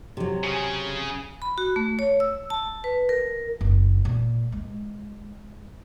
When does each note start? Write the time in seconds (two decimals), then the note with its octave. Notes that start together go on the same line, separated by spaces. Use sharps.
0.17 C3 F#3
0.43 C#3 G#4
1.42 B5
1.58 F#4
1.76 A3
1.99 C#5
2.20 E6
2.50 A5
2.84 B4
3.09 A#4
3.61 F#1
4.05 A#2
4.52 G#3